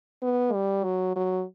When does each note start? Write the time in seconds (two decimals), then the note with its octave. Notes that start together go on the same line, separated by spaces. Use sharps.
0.22 B3
0.53 G3
0.84 F#3
1.16 F#3